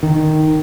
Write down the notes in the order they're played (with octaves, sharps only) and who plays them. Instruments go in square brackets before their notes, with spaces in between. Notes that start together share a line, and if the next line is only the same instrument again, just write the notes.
[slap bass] D#3